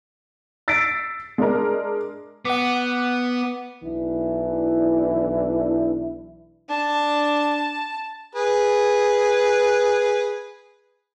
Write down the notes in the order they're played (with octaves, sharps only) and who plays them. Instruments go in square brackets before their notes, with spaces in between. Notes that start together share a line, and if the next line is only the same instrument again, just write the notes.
[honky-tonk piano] E6 A6 B6 C7 D7
G#3 D4 A#4
[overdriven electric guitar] B3 [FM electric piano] F#5 D6
[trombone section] B1 E3 D4 E4
[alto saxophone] D4 [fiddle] A5
[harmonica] G#4 B4